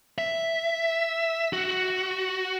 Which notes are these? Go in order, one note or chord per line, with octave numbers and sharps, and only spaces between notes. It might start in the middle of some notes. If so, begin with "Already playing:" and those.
E5
F#4